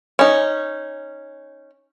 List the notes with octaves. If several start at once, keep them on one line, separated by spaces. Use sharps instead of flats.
C#4 D#4